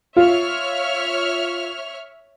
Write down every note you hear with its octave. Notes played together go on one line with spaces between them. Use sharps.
F4 C#5 E5 F6